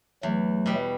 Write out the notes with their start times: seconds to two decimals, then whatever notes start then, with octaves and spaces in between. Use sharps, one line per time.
0.23 E2 F#3 A3
0.66 B2 G3